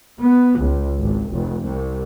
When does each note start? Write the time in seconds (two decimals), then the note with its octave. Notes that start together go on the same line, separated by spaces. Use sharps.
0.20 B3
0.57 C#2
0.98 G#1
1.31 F1
1.65 C2